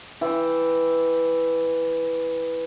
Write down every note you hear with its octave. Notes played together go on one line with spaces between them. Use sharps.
E3 G5